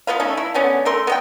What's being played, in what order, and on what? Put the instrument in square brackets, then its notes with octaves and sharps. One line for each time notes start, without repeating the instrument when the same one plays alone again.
[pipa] B3 F4 B4 F5
A3 C#4 D#4
E4
D3 B3 C#4
A3 A#4 C6
B3 D#5 G5